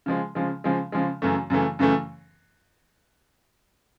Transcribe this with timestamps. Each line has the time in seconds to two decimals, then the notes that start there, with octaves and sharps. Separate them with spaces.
0.06 C#3 F3 G#3
0.35 C#3 F3 G#3
0.64 C#3 F3 G#3
0.92 C#3 F3 G#3
1.22 F#2 C#3 E3 A3
1.50 F#2 C#3 E3 A3
1.79 F#2 C#3 E3 A3